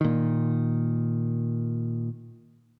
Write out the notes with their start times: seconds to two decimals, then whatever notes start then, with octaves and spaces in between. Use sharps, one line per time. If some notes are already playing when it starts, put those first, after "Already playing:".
0.01 A#2 D#3